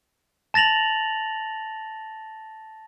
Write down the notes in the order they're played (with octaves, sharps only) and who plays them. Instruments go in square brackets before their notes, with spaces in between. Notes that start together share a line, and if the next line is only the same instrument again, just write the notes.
[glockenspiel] A5 A6 A#6 F7 F#7